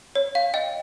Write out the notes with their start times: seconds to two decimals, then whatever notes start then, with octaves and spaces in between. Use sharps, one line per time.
0.15 C#5
0.35 F5
0.54 D#5 G5